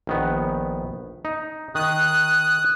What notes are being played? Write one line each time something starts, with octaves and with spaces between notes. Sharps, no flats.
A#1 D#3 B3
D#4
D#3 D#6 F#6